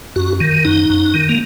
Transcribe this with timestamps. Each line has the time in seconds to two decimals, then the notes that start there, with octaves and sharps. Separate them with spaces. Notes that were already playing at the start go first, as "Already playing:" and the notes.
0.16 F#2 F#4
0.40 D#3
0.65 F#2 D#4
0.90 F#2
1.14 D#3
1.29 A#3